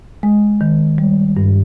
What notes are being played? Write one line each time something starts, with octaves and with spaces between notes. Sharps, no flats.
G#3
D#3
G3
G2